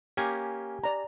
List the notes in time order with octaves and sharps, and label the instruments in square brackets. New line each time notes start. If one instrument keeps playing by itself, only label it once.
[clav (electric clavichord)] A#3 C#4 [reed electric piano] G4 G#5
[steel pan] D5 A#5